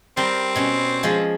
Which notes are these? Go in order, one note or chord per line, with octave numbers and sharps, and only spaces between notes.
G3 C4 A#4
B2 C#4
F3 G#3